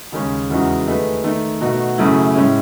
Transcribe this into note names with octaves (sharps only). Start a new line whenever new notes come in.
D#2 C#3 G#3 C#4
E2 C#3 G#3 D#4 F#4
D#3 A3 D#4 G#4 B4
D#3 A3 D#4
B2 A3 D#4 F#4
F#2 C#3 F#3 A3 E4
A2 G#3 C#4